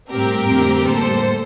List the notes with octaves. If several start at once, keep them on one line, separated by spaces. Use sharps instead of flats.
A2 G3 C4 G4 A#4
F2 D3 A3 C4
A2 G3 A#3 A4 C5